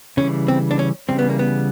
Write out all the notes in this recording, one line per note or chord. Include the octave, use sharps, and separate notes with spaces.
C#3 E3 G3 C#4
C4
D4
C#4
C#3 E3 G3 C4
B3
A#3
B3